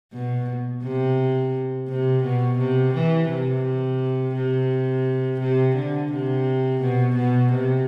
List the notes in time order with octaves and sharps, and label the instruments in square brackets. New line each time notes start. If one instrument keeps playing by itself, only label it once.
[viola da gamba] B2
C3
C3
B2
C3
E3
C3
C3
C3
D3
C3
B2
B2
C3